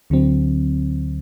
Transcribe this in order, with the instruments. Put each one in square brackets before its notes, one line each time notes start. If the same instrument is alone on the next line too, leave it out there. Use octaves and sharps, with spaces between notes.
[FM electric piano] D2 D3 F#3 C4